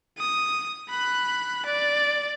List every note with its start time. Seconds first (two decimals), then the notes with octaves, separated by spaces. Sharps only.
0.18 D#6
0.89 B5 F#6
1.65 D5